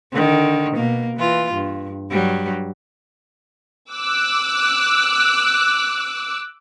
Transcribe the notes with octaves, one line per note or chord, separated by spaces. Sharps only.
D3 D#3
B2 A#3
E3 F4
G2
G2 F#3 G3
D6 E6 F#6